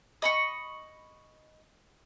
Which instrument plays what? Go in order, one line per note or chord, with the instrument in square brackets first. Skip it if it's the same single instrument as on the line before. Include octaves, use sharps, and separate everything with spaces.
[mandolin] D#5 B5 C#6